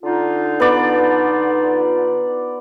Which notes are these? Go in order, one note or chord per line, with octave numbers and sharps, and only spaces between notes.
D3 D#4 F4
B3 D5